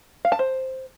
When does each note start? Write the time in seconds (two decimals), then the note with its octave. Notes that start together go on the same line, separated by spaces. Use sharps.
0.25 F5
0.32 A5
0.39 C5